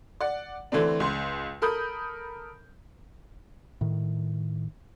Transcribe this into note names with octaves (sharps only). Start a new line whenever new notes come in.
D5 F#5
D3 E3 A3 C4 D4
C#2 C6
A4 A#4 B5 D#6 G6
A2 D#3